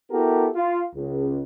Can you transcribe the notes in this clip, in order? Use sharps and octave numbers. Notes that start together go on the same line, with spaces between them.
B3 E4 F#4 G4 A4 A#4
F4
C#2